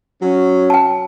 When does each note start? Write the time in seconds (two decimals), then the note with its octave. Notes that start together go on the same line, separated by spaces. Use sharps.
0.22 F#3 C#4
0.70 G5 A5